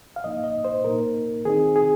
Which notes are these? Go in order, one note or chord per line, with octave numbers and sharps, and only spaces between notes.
F5
G#2 F3 A#3 D#4 D#5
D#5
C5
A#2 A#3 D#4 A#4
D#3 C4 D#4 G#4
G#4